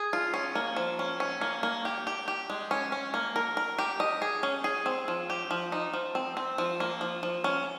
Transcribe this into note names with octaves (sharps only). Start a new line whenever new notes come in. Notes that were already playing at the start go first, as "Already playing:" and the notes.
Already playing: G#4
F4
C#4
A#3
F3
C#4
C#4
A#3
A#3
G4
G4
G4
G#3
C#4
C#4
A#3
A#4
A#4
G4
D#5
G#4
C#4
G#4
C4
F3
G4
F3
D#4
F3
C4
C4
F3
A#3
F3
F3
C#4